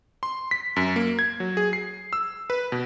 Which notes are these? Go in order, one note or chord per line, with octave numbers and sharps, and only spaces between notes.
C6
B6
F#2
A#3
G#6
F#3
G#4
C7
E6
B4
B2